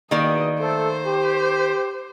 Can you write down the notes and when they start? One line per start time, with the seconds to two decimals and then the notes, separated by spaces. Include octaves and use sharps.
0.11 E2 B2 D#3 A#3 D5 D#5
0.59 A3 A4 C5
1.06 G4